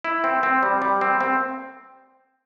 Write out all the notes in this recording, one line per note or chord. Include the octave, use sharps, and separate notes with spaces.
E4
C4
C4
G3
G3
C4
C4